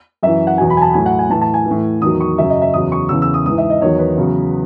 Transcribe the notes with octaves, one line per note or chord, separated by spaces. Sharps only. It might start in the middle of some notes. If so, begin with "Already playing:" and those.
F#2 E3 E5
F#5
E2 B2 F#3 G#5
B5
G#5
A5
A2 F#3 G#5
F#5
G#5
A2 E3 A5
A5
G#5
A2 E3
E2 D#3 F#3 D#6
C#6
F#2 C#3 F#3 E5
D#5
E5
E2 C#3 F#3 D#6
C#6
E2 C#3 E3 E6
E6
D#6
G#2 E3 D#6
E5
D#5
E2 D#3 F#3 C#5
B4
E2 C#3 F#3